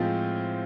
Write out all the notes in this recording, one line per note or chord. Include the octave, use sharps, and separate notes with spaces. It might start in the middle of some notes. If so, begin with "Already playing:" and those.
Already playing: A2 F3 G#3 C4 F4